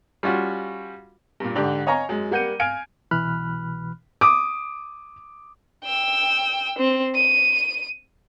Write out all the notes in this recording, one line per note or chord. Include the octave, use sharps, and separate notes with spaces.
G3 C#4 F4 F#4
G2 A#2
G#2 D3 D4 G4
C#5 D#5 F5 G#5 A#5 C#6
F#2 G#3
G3 A#3 F#5 G6 C#7 D#7
F5 G#5 F6 G#6 D7
C2 B2 E3 B5 F6 F#6
D6 D#6
G5 E6
C4
D#7